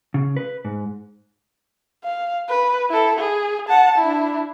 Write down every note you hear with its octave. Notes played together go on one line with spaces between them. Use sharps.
C#3
B4
G#2
F5
B4
E4 A4
G#4
F#5 A5
D4 E4